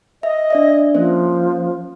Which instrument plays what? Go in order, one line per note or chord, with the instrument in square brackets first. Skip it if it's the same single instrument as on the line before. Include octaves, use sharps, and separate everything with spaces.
[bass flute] D#5 [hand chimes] E5
[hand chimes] D4 D5 E5
[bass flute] F3 [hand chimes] A#3 C#4 C5